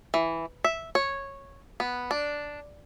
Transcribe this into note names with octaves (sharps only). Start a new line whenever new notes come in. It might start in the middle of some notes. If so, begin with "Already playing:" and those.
E3
E5
C#5
B3
D4